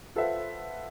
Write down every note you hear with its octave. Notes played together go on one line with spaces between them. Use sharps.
F4 A4 B4 C5 E5 F#5